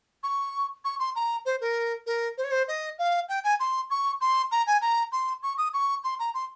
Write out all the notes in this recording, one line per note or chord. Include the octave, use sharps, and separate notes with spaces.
C#6
C#6
C6
A#5
C5
A#4
A#4
C5
C#5
C5
D#5
F5
G5
G#5
C6
C#6
C6
A#5
G#5
A#5
C6
C#6
D#6
C#6
C6
A#5
C6